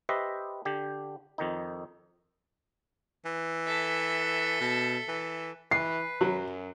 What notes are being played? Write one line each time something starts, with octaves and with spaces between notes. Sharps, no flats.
G4 B4 C5 D#5 E5
D3 G4
F2 D#3 D#4
E3
A4 E5
B2
E3
E3 B4 C7
F#2 F#3